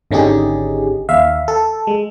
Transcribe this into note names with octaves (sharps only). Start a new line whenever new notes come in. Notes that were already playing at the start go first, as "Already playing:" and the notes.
G#1 D3 C#4 D#4 G4 G#4
D#2 E5 F5
A4
G#3